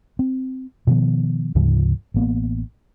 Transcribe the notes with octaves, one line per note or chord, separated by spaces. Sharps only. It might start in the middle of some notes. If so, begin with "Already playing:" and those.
C4
B2 D#3 F3 B3
D2 G#2 C#3 F3
A1 A#3 B3